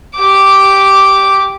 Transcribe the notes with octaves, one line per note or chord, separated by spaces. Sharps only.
G4 D6